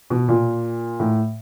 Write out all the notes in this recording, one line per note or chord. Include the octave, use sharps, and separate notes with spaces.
B2
A#2
A2